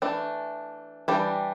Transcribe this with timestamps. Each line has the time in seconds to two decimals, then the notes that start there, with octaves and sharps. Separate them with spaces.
0.02 E3 A3 D4
1.08 E3 G3 D4 G4